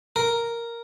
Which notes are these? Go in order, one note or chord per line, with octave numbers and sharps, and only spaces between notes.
A#4